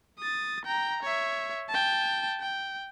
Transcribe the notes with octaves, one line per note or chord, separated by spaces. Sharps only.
D#6 A6
G5 A#5
C#5 E5
G5 A5
G5